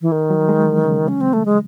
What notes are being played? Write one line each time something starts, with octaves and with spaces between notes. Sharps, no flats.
E3
D#3
F#3
G#3
E3
C#3
C#4
C4
A3
G#3